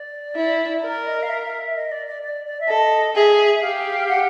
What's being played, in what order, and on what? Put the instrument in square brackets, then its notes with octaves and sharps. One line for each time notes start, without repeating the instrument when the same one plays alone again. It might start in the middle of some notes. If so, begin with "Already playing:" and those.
Already playing: [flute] D5
[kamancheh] E4
[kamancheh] A#4 [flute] D5
[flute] D#5
F5
E5
D#5
D5
D5
D5
D5
E5
[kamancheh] A4 [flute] D#5
[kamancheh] G#4 [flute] E5
[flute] E5
[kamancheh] G4 [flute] F5
[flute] F#5